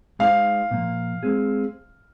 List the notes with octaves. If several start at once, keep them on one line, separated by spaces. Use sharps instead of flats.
G#3 D#4 C5 F5
A#2 F3 A#3
G#3 C4 G#4